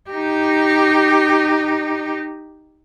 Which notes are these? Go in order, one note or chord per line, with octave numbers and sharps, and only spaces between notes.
D#4 G4